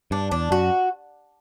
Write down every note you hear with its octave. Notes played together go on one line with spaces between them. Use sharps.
G2 D4
E2 D4
F#2 F#4